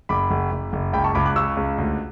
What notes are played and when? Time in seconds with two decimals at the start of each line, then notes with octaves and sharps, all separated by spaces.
0.09 F#1 B5 D6
0.31 F#1
0.52 F#1
0.73 F#1
0.93 C#2 G5 B5
1.04 A5 C#6
1.15 C#2 B5 D6
1.25 D6 F#6
1.36 C#3 C#6 E6
1.57 C#2
1.78 D2